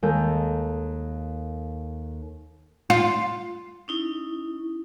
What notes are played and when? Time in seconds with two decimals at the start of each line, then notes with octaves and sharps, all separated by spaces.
0.02 D#2 G#3 A4 G6
2.90 F4
3.88 C#4 D#4 E4